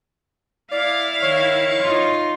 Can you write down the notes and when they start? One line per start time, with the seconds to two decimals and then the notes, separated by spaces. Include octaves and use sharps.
0.72 E4 D5 F5
1.22 D#3 C#5
1.82 D#4 F4